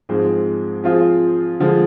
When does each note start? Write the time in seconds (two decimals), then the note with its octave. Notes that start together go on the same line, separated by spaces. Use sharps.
0.09 G#2 F3 G#3 C4
0.84 F3 C4 F4 G#4
1.60 D3 F3 G#3